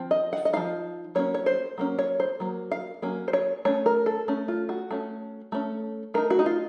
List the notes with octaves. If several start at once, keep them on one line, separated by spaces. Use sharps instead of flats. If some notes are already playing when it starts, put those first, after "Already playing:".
Already playing: F3 C4
D#5
F#5
D#5
F3 C4 D#4 F5
F#3 A#3 C#4 C#5
C#5
C5
F#3 A#3 C#4
C#5
C5
F#3 A#3
F5
F#3 A#3 C#4
C5
C#5
A3 C#4 C#5
A#4
A4
A3 C#4
F4
F#4
A3 C#4
A3 C#4
A3 D#4 A#4
F#4
D#4
F4